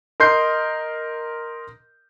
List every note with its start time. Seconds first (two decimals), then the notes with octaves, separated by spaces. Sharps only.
0.20 A#4 D#5 C6 G6 C7